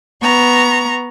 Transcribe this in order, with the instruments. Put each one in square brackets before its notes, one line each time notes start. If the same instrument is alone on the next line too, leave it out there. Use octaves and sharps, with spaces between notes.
[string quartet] B3 A#5 C#6